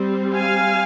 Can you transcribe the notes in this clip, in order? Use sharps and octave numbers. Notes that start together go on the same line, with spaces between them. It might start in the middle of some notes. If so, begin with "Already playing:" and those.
Already playing: G3 C4
F5 G#5